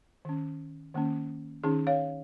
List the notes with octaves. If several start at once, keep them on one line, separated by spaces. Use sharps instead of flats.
D#3 C#4
D#3 A#3 C#4
D#3 C#4 D#4 G#4
C#5 F5